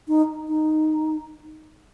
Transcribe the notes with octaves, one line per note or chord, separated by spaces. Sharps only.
D#4
D#4